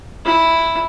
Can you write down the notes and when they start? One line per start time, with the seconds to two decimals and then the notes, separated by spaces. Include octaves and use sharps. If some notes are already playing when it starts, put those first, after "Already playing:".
0.25 E4